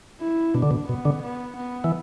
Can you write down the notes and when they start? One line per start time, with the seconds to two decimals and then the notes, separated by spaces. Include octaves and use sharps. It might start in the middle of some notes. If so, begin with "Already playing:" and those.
0.21 E4
0.54 B2 D4
0.62 D3
0.71 B2
0.89 B2 B3
1.05 D3
1.23 B3
1.57 B3
1.84 E3